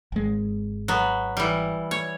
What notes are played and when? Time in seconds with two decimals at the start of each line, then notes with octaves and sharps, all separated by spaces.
0.12 G#1 G#3
0.88 F#3 B3
1.37 E3 G3
1.91 C#5